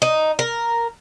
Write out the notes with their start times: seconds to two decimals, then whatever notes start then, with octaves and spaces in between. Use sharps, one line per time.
0.02 D#4
0.39 A#4